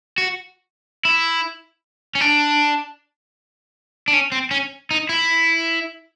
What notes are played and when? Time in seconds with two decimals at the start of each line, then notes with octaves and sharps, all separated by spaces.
0.18 F#4
1.05 E4
2.15 C#4
2.21 D4
4.08 D4
4.13 C#4
4.32 C4
4.51 C#4
4.91 D#4
5.09 E4